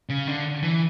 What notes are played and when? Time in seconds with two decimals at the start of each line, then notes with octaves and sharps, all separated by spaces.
0.09 C#3
0.27 D3
0.63 E3